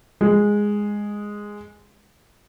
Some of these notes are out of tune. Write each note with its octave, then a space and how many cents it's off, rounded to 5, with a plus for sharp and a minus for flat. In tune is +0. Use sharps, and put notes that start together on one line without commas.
G#3 -5